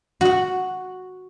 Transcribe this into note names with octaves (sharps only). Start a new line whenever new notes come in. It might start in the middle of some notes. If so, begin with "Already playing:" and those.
F#4 F#5